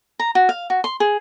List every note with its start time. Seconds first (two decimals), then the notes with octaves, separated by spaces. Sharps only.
0.19 A#5
0.35 F#4
0.49 F5
0.70 F#4
0.84 C6
1.00 G#4